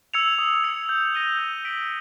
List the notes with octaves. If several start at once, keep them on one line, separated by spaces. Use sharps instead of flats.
E6 G#6 C#7 F7
D#6
G#6 C#7
G6
A#6 D#7 G7
G6
B6 D7 F#7